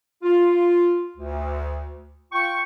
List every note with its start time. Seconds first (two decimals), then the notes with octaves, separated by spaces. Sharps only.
0.23 F4
1.16 D2
2.33 F4 G5 C#6